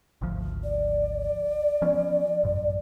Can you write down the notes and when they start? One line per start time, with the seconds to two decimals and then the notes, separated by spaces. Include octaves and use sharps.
0.21 G#1 D2 F3
0.64 D5
1.82 F3 B3 C#4
2.43 A1 F#2